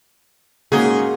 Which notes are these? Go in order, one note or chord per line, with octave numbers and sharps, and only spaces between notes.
G#2 C#3 A#3 F#4 G#4 C6